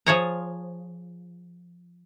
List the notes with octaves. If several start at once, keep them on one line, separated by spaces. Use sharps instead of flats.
F3 F4 G#4 C#5 G#5 A#5